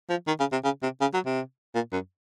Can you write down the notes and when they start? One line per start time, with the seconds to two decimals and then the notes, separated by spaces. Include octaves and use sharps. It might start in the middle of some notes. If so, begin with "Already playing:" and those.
0.10 F3
0.27 D#3
0.40 C#3
0.52 C3
0.64 C#3
0.83 C3
1.01 C#3
1.14 F#3
1.26 C3
1.75 A#2
1.92 F#2